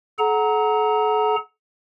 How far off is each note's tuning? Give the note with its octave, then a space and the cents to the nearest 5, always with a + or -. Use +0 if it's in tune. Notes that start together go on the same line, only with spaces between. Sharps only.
A4 -45 F#5 +0 A#5 +0